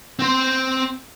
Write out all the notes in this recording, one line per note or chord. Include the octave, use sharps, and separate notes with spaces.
C4 C5